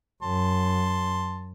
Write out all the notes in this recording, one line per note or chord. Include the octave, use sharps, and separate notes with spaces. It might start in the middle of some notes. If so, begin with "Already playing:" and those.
F#2 A5 C6